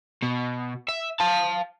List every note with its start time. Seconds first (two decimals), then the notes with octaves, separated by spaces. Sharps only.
0.22 B2
0.88 E5
1.20 F5 A5